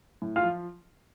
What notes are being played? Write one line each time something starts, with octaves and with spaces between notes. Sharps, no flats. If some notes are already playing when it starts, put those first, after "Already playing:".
A2
F4 F5
F3